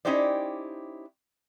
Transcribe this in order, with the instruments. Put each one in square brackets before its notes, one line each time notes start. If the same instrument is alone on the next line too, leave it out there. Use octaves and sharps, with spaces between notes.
[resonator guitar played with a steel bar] C#4 D#4 E4 G4 C5 D5